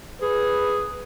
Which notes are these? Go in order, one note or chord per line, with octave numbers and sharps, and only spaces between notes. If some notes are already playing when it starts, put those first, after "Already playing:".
G#4 B4